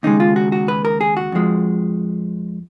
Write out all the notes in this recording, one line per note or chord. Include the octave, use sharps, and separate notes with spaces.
D#2 C#3 G#3 D#4
F4
F#4
F#4
B4
A#4
G#4
F#4
F2 F3 G#3